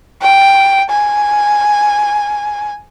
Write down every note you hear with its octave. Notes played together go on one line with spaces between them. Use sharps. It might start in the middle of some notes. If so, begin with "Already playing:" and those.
G5
G#5